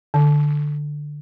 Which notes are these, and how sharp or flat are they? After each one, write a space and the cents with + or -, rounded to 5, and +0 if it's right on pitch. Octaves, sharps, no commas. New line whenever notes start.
D3 +10